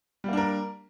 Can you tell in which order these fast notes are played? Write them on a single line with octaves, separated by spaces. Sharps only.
G3 A#3 D4 A#4